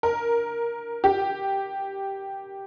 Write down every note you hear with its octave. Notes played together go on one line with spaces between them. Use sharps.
A#4
G4